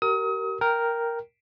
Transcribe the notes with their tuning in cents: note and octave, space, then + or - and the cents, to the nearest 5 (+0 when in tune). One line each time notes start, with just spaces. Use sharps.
G4 -35 A#4 -10 D#6 +35
A#4 +0 G5 +0